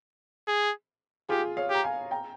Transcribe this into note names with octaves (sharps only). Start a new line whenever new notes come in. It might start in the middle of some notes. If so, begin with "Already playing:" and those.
G#4
F4 G4 G#4
C#5 F5
G4 A#5
F5 G#5
G5 A#5